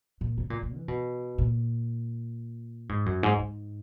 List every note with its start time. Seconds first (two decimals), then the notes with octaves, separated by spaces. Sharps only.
0.21 A#2
0.38 C#3
0.50 A#2
0.63 A#2
0.76 E3
0.88 B2
1.38 A#2
2.89 G#2
3.06 F#2
3.23 G#2
3.40 G#2